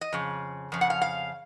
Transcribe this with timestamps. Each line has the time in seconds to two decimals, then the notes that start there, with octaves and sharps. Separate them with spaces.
0.01 D#5
0.13 F2 C#3
0.72 F2 C#3
0.81 F#5
0.90 F5
1.02 F5